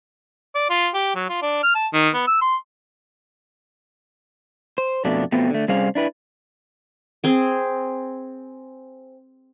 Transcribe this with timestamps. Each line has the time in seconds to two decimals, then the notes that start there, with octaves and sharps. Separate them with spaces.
0.55 D5
0.70 F4
0.94 G4
1.15 F#3
1.29 F4
1.42 D4
1.63 F6
1.75 A5
1.93 D#3
2.14 B3
2.27 E6
2.41 C6
4.78 C5
5.05 F2 B2 A3 D4
5.32 B2 F3 A3 B3 C4
5.50 D3 A3
5.68 C3 G3 C#4 G#4 C5 F5
5.95 D4 E4 B4
7.24 C4 G#4